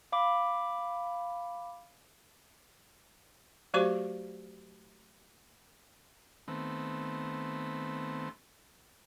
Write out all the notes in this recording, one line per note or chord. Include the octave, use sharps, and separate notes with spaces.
F5 B5 D6
F#3 A3 F#4 G4 C5 C#6
D#3 A3 B3 C4